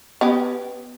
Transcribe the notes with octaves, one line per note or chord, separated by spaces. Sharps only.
B3 C#4 G4